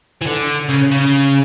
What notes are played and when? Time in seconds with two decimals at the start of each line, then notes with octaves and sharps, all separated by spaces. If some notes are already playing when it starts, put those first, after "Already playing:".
0.21 E3
0.26 D3
0.69 C#3
0.92 C#3